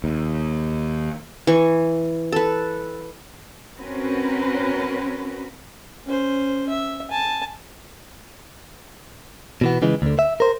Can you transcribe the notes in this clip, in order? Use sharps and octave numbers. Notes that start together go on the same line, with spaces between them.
D#2
E3 C#6
A4 B4
C4 C#4 F#4 A#4 B4
C#4 C5
E5
G#5 A5
B2 E3 B3
C#3 E3 G#3
D2 D3
E5
A#4 C5